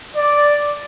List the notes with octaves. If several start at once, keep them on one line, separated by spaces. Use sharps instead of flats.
D5